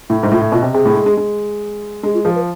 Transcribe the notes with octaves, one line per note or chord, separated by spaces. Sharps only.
A2 E4
G#2
A2 F4
A2
B2 F4
C3
C3 G#4
A2
G#3
G#3
G#3
G#3 G#4
F4
F3 G#4
B4